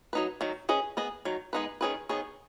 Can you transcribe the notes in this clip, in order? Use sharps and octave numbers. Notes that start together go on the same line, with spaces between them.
F#3 D#4 B4
D#3 F#3
C#4 G#4 B4 D#5
B3 G#4 D#5
D#3 F#3
G#3 B3 D#4 B4
D#3 F#3 C#4 G#4 B4
D#3 B3 G#4 C#5